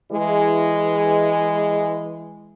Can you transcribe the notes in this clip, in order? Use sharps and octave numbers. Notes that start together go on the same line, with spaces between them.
E3 G#3